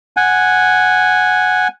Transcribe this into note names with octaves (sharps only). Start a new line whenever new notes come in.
F#5 G#5